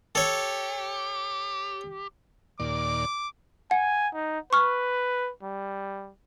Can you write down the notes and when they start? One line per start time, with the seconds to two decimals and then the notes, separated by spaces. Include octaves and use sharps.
0.15 G4 A4 C#5
2.60 D#2 A#2 D5 D6
3.71 F#5 G#5
4.14 D#4
4.53 B4 C#6 F6
5.43 G3